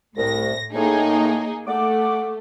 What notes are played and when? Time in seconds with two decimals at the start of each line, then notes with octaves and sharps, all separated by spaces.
0.17 C2 A2 A#6
0.74 A2 A#3 D#4 G#4
1.67 A3 F#5 D6